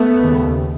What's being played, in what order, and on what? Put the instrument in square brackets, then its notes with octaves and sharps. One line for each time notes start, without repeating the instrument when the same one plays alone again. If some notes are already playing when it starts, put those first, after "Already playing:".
Already playing: [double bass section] A3 B3
D#2 C#3